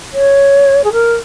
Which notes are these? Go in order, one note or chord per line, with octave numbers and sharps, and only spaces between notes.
C#5
G#4
A#4